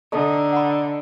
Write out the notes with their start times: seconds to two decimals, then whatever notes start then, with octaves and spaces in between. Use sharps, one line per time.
0.12 D3 A4 D#5 A5 A#5
0.53 F#5 B5